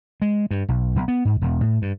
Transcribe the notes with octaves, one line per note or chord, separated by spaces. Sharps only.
G#3
G2
B1
B1
B3
G#2
E1
A2
G2